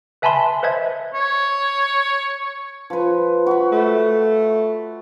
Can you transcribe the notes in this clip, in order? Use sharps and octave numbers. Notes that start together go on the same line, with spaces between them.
B4 E5 G#5 A5 B5 C6
B4 C5 D#5 E5 G#6
C#5
F3 B4
F#4 B5
A3